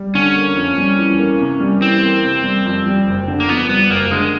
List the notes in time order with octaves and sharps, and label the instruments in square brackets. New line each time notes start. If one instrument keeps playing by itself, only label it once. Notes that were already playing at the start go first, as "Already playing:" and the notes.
Already playing: [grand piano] G3
[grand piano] D3 [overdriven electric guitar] C#4
[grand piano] A#3
F2
G3
E3
A#3
C3
G3
[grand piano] E3 [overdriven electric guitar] C4
[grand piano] A#3
C3
G3
F2
G3
F#1
D3
[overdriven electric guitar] A#3
[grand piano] F2 [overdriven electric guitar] B3
[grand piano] G3 [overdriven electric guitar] B3
[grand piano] F#1 [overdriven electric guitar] A#3
[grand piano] D3 [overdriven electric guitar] G#3